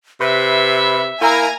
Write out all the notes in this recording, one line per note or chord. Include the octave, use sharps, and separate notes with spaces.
C3 B4 E5
A#3 E4 G#5 A#5